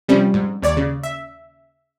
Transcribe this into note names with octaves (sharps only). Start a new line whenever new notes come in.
C3 F3 G3 C#4
G#2
D#2 C#5 D5
C#3
E5